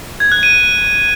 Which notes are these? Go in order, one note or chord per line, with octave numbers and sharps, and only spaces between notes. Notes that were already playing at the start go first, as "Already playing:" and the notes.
G#6
F#6
D#7